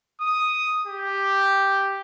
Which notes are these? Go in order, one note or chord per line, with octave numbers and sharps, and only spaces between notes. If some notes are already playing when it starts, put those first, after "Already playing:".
D#6
G4